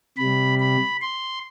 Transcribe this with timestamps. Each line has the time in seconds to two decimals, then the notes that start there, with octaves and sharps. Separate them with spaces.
0.18 C3 G3 B5
0.60 B5
1.01 C6